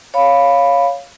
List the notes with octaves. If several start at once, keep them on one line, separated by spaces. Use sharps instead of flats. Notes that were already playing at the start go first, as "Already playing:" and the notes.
C#5 F5 B5